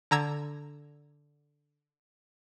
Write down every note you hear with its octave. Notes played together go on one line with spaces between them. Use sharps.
D3 A#5 E6 G#6